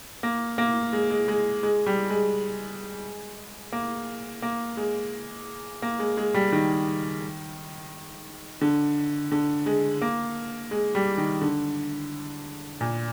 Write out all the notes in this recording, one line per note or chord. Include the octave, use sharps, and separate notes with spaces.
A#3
A#3
G#3
G#3
G#3
G#3
G3
G#3
A#3
A#3
G#3
A#3
G#3
G#3
G3
D#3
D3
D3
G#3
A#3
G#3
G3
D#3
D3
A#2